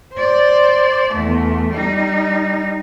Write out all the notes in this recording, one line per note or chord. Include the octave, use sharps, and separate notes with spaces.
C5 D5
E2 A3
G3 D#4